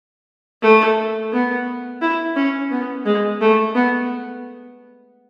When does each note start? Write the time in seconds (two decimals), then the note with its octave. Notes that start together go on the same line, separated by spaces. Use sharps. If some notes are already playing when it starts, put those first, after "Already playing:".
0.62 A3
1.32 B3
2.02 E4
2.36 C#4
2.71 B3
3.06 G#3
3.41 A3
3.75 B3